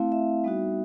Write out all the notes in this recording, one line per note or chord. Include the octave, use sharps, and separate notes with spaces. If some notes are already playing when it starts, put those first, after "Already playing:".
Already playing: A3 C4 E4 F5
E5
G3 B3 D#4 F#4